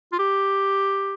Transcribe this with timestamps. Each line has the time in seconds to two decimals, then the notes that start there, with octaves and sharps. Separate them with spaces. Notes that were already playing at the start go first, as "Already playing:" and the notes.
0.12 F4
0.19 G4